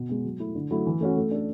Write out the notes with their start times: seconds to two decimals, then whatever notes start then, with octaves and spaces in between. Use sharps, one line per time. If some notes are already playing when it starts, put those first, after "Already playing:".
Already playing: B2
0.09 G#3 B3
0.25 F#3
0.40 A3 E4
0.55 D3
0.71 F#3 A3 E4
0.86 E3
1.00 A3 C#4 F#4
1.16 A3
1.31 D4 A4